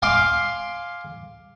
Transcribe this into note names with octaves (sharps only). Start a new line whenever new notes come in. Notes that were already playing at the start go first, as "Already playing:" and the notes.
F5 G#5 C6 D6